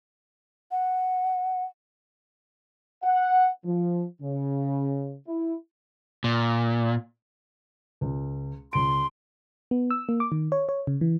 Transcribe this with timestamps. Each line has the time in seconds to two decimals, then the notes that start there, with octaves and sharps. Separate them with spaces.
0.71 F#5
3.03 F#5
3.65 F3
4.22 C#3
5.26 E4
6.24 A#2
8.01 C#2
8.73 C#2 C6 D7
9.71 B3
9.91 E6
10.09 A#3
10.20 D6
10.32 D#3
10.52 C#5
10.69 C#5
10.87 C#3
11.01 E3